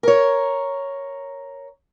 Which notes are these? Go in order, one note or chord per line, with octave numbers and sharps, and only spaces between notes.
A#4 C#5